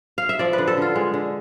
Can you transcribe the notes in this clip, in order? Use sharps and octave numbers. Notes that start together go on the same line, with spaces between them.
F5
E5
F3 D5
B4
D3
A4
D3 F4
G#3
D3